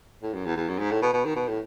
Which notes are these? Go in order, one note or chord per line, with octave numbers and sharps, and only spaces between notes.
A2
F#2
E2
E2
F#2
G#2
A2
B2
B2
D#3
B2
A2